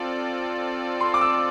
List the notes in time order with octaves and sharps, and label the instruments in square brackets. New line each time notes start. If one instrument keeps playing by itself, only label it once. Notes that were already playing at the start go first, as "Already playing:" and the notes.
Already playing: [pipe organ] C4 F4 A4 D5
[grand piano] C6
D6
E6